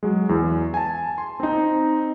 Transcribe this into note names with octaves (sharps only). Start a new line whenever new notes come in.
F#3 G#3
E2
G#5 A5
C6
C4 D#4